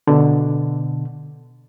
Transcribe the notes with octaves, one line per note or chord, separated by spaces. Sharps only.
B2 D3